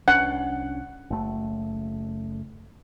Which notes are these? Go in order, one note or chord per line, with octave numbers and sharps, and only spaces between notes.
C2 C#4 D4 F#5
F#1 A3